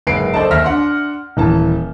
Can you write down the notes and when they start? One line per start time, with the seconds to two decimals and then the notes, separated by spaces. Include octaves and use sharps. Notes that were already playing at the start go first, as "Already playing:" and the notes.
0.07 F#1 G#2 B4 C7 D7
0.34 A4 C5 D5 D#5 A5
0.51 D#2 E5 F6 A#6
0.64 D4 F#5 C6
1.37 D#1 E3 A5